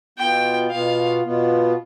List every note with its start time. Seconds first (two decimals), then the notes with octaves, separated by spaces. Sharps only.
0.18 B2 B3 F4 G5
0.71 B2 B3 F4 F5
1.24 B2 B3 F4